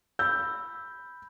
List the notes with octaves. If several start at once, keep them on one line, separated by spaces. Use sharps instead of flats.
B5 E6 G6